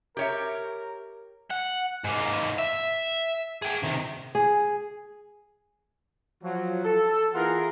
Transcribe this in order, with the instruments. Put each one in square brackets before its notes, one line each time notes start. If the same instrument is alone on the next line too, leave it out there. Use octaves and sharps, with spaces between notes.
[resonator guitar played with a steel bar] G4 C#5 E5 [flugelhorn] A#4
[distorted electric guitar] F#5
G#2 A#3
E5
G#4 G5
C3 D#3
[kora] G#4
[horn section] F3 F#3
A4
E3 A#3 F4 G#4 A#4 F#5